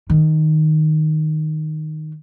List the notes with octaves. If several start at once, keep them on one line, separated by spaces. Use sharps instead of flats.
D#3